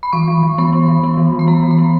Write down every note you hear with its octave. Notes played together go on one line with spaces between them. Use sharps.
B5
E3 C#6
E3
E3
B3 B5
B3
E3
B3
E3
E3
B5
B3 A#5
E3
B5
B3